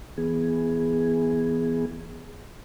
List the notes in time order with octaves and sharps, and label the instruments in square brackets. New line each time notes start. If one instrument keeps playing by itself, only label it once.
[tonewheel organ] E3 B3 G#4